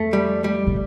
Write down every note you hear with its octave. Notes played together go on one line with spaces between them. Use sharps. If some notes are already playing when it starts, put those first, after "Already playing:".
Already playing: F2 A3
G3
G3
A2